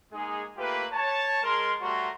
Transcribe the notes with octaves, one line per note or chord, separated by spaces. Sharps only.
G#3 A#3 D#4 G#4
A3 A#3 F4 G4 B4
C#5 A5
G#3 A#4 C6
G3 A3 F#4 C#5 A#5 C6